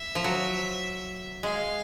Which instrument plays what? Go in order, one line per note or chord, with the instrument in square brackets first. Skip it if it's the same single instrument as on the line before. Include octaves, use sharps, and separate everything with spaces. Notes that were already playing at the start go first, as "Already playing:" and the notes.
Already playing: [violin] E5
[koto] F3
F#3
[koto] G#3 [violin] F5